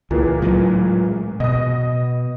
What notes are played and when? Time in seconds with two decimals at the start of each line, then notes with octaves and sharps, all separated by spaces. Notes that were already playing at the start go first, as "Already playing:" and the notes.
0.11 C#2 A#2 E3 G#4
0.42 A2 F#3 G#3
1.40 B2 D#5 D#6